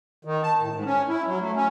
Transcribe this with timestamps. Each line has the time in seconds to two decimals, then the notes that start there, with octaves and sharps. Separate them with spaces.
0.25 D#3
0.43 A5
0.60 A2
0.73 G#2
0.85 C#4
1.09 E4
1.27 F#3
1.41 A3
1.55 C#4